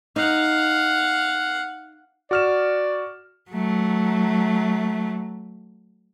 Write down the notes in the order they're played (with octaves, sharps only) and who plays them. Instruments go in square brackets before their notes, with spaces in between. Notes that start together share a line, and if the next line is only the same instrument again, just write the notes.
[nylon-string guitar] D#4 [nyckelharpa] F5 F#5
[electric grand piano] F#4 F6 E7 [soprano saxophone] D5
[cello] F#3 A3